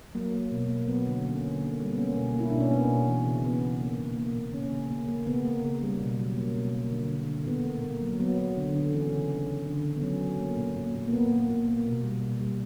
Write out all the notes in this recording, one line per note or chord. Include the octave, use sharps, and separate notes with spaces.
F#3 A#3
A#3
B2
A#3
F#3 B3
D3
A#3 C#4
D3
A#3
G3
B3
A#3 C#4
B2
A#3
E4
B2 D4
C#4
A#3 B3
B2
E3
C#3
E3 B3
C#3
A#3
A#2
A#3
A#2
C#3 C#4
C#3
A#3
A#3
C#3 B3
A#3
C#3
G3
B2
F#3
A#3
B2
A#3
D3
D3
D3
A#2 B3
A#3
A#3
F#3
F#3 B3
F#3
D3
D3
E3 C#4
C#3
C#3
C#3
D3
D3
B3
F#3 C#4
F#3
A#3
A#2
A#2
A#2
A#3
A#2 B3
A#3
A#2
A#3
B2
G3
B2
G3